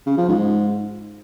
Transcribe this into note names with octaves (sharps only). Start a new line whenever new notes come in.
C#3
F3
G#2